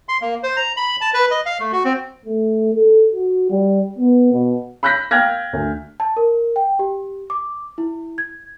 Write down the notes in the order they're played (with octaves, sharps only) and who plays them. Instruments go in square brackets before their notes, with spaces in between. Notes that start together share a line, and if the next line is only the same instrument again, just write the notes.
[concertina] C6
A#3
C5
A#5
B5
A5
B4
D#5
F5
A3
F#4
C4
[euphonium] A3
A4
F#4
G3
B3
B2
[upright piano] B5 E6 F#6 G6 A#6 B6
F5 G5 F6 F#6 G#6 A#6
D2
[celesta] A5
A#4
G5
G4
D6
E4
G#6